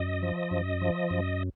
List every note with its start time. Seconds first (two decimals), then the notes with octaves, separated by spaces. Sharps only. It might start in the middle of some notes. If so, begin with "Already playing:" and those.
Already playing: F#2 D#5
0.22 F3
0.51 F#2
0.81 F3
1.10 F#2